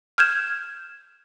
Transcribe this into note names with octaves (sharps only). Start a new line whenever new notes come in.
F6 G6 G#6 E7